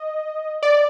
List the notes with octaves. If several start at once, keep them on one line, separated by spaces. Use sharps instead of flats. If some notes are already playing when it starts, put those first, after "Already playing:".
Already playing: D#5
D5